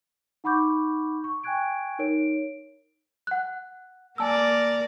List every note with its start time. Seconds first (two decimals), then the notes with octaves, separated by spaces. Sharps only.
0.44 D#4 F#5 B5 C#6 D6 G6
1.24 C#6
1.44 G5 G#5 C#6 F#6 G#6 D7
1.99 D#4 A#4 C#5 D7
3.27 F#5 F#6
4.18 A#3 A#4 D5 G#5 A5 E6